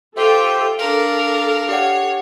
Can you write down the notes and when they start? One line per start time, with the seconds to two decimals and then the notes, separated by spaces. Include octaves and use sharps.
0.17 F4 G4 A4 C5 E5 G5
0.79 D4 A4 A#4 F5
1.69 G4 C#5 D5 F#5